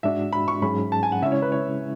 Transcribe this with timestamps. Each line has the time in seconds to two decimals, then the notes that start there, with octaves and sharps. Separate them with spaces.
0.03 G#2 G#3 D4 F#4 E5
0.33 B5
0.48 C#6
0.62 G#2 F#3 C#4 G#4 B5
0.92 A5
1.03 G#5
1.12 F#5
1.22 C#3 G#3 C#4 E4 E5
1.32 C#5
1.42 B4
1.52 C#5